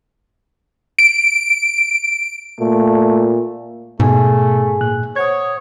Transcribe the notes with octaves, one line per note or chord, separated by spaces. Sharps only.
D7
A#2 A3
G#2 B2 A3 G#4 G#5
A#2 F#6
C5 C#5 F#5 D#6 G#6